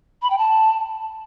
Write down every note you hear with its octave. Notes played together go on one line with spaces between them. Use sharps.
B5
G5
A5